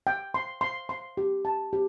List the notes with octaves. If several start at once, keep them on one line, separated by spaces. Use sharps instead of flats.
G5
C6
C6
C6
G4
A5
G4